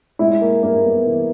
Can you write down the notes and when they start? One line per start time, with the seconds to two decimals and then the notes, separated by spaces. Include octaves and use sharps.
0.19 G#3 E4
0.41 A#3
0.63 G2 A#3
0.84 B3
1.06 E3